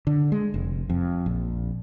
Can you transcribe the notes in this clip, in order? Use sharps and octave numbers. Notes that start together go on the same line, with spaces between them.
D3
G#3
F1
F2
A#1